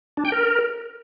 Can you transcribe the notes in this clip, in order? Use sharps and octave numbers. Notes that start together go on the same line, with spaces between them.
D4
G5
A#4